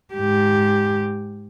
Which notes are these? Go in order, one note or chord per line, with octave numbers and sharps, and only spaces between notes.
G#2 G4